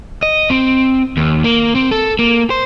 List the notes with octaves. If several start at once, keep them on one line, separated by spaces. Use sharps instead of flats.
D#5
C4
D#2
A#3
C4
A4
A#3
C5